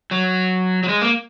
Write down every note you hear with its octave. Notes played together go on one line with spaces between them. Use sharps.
F#3
F#3
G#3
A#3